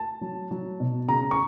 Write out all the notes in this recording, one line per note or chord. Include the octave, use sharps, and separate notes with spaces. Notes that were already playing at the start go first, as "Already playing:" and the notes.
Already playing: A5
F#3
F#3
B2
C#3 A#5
C#6